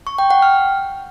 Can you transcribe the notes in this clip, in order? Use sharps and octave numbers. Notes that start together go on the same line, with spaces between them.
C#6
G5
F#5
F6